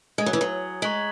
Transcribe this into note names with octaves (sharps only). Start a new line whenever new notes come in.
G#3 G#5 D#6 G#6
F#3
E3
F#3
G#3 A#5 C#6 F#6 B6 F#7